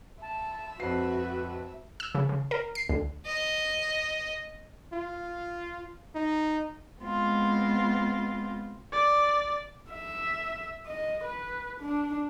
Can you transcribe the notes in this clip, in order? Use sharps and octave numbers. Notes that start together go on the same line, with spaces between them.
E5 A5
F2 F#4 B4 C7
E6
C#3
C#3
A#4
C7
D2
D#5
F4
D#4
G#3 B3 C4 F4
D5
E5
D#5
B4
D4